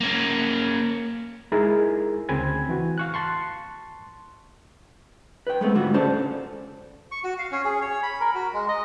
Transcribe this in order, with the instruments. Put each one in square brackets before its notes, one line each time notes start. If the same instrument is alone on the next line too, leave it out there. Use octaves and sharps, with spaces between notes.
[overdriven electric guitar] A#3 C#4
[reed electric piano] G#3 D#4 E4 G#4 A#4
D2 C#3 C4 G#5 B5 G#6
E3 F#4
F5 C#6 F#6
A5 C6 C#6
[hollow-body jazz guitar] B4 G5
G#3 A3 B3 C4
G#2 D3 G3 F4 F#4
C#3 C#4 A4 C5 D5 A5
[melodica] C#6
F#4
F5
C#4
G#4
C#5
B5
A#4
F#4
G#3
D#5